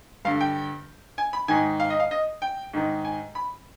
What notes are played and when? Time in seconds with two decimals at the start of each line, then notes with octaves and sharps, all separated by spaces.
0.25 G2 D3 F5
0.40 G5
1.18 G#5
1.33 B5
1.48 G#2 D#3 G#5
1.80 F5
1.90 D#5
2.00 F5
2.11 D#5
2.42 G5
2.74 G#2 D#3
3.05 G#5
3.35 B5